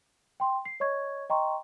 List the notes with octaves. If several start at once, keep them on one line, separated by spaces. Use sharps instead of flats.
G5 C6
C7
C#5 D#5 C#6 G#6
D#5 G5 A#5 C6 C#6